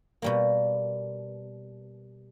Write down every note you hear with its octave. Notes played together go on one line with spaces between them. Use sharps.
B2 G3 A#3